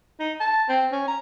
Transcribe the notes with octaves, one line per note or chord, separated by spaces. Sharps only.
D#4
A5
C4
C#4
A#5